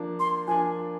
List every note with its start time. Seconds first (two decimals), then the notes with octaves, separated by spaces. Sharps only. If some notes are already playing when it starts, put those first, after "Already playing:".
Already playing: F3 A#3 D4
0.20 C6
0.47 F3 A#3 D4 G#5